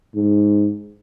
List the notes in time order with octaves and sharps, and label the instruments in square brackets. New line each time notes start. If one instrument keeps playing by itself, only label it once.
[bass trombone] G#2